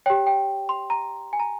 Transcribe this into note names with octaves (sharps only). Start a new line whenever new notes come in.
G4 C#5 G5
G5
C6
A#5
G#5
A#5